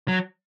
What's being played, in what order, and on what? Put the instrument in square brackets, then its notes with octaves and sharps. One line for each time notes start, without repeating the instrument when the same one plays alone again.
[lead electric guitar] F#3